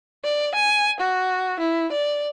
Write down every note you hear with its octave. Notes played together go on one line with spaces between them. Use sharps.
D5
G#5
F#4
E4
D5